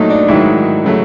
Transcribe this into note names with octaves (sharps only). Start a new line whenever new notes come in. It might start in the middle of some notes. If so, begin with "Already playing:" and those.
Already playing: A#2 F#3 A3 D#4 A4
D4
G#2 D#3 F#3 E4
C#3 F#3 A3